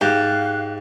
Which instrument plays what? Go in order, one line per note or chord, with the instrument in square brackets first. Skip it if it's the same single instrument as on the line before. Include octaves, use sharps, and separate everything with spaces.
[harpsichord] G#2 [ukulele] G4 [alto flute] F5 [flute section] F#6